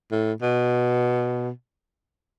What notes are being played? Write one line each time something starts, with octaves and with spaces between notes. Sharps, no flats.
A2
B2